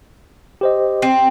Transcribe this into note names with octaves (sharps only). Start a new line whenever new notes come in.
G4 C5 D#5
C4